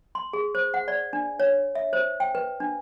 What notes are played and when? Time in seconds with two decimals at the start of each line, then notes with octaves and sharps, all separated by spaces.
0.15 C6
0.33 G#4
0.55 C5
0.74 F#5
0.88 D5
1.13 D4
1.40 C#5
1.75 E5
1.93 C5
2.20 G5
2.35 B4
2.60 D4